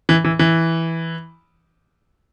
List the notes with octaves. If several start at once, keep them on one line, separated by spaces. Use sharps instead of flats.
E3
E3
E3